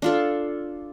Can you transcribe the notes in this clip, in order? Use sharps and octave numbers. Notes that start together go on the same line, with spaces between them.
D4 F4 A4